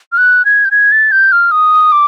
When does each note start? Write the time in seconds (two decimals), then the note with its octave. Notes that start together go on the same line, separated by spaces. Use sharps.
0.12 F6
0.18 F#6
0.45 G#6
0.65 G6
0.71 G#6
0.92 A6
1.12 G6
1.32 F6
1.51 D#6
1.92 D6